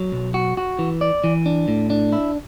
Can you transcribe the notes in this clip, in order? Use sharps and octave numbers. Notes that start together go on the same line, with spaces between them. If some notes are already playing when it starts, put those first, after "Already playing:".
Already playing: F#3
B1
F#4
F#4
E3
D5
E3
D4
A2
D4
E4